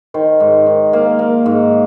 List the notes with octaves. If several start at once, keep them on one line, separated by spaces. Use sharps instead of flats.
D#3 C5
G#2
D#3
A#3 F5
A#3
G#2